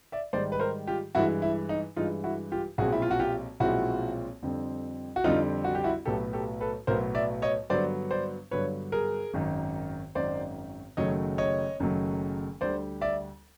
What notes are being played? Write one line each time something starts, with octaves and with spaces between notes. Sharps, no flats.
D5 E5
G#2 D#3 G3 C5 D5
B4
A#4 C5
F4 G4
G2 E3 G#3 E4 F#4
E4
D#4
G2 E3 G#3 D#4 F4
E4 F#4
F4 G4
B1 A#2 F3 G#3 C4 F#4 G#4
E4
F4
F#4
F4 G4
B1 A#2 F3 G#3 C4 E4 F#4
F2 D3 G3 C4
F#4
F2 D3 G3 C4 D#4 F4
F#4
G4
E4 F#4
B1 A2 F#3 B3 G4 A4
G4 A4
A4 B4
B1 A2 F#3 B3 A#4 C5
D5 E5
C#5 D#5
G2 D3 F#3 B3 C5 D5
C5 D5
G2 D3 F#3 B3 B4 C#5
G#4 A#4
G#1 F#2 D#3
G#1 F#2 D#3 C5 D5
F#1 F#2 D#3 F#3 A3 C#5 D#5
C#5 D#5
F#1 F#2 D#3 F#3 A3
D2 D3 G3 C5 D5
D5 E5